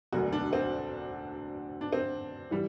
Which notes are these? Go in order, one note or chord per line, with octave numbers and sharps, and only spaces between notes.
E1 D2 D3 F#3 F#4
D4
C4
D4
C4
E3 G3